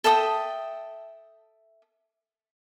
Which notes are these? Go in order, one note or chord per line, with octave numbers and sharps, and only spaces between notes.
A4 E5 G5 D#6